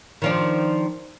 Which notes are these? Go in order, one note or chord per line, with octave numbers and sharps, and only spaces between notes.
D#3 F3 D4